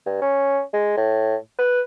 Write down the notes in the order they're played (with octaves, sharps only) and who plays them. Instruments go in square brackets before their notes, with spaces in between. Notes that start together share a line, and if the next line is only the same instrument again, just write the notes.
[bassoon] G2
C#4
G#3
A2
B4